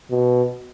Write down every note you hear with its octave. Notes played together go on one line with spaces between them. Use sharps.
B2